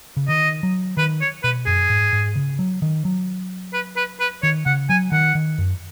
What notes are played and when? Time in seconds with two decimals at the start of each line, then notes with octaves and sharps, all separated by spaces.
0.17 C#3
0.28 D#3 D#5
0.63 F#3
0.97 D#3 B4
1.21 C#5
1.43 B2 B4
1.66 F#2 G#4
1.90 G#2
2.13 G#2
2.36 C#3
2.59 F#3
2.82 D#3
3.05 F#3
3.73 B4
3.96 B4
4.20 B4
4.43 D#3 C#5
4.66 C#3 F#5
4.89 F#3 G#5
5.12 D#3 F#5
5.35 D#3
5.58 F#2